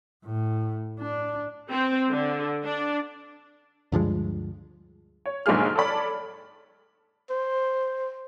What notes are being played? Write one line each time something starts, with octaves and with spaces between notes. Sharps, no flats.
A2
D4
C4
D3
D4
D2 G2 F3 G#3
C#5
B1 G#2 D3 A#3 G#4 F6
A4 C#5 D5 B5
C5